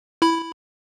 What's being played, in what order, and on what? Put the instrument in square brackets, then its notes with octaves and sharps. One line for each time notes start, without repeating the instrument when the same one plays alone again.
[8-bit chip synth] E4 B5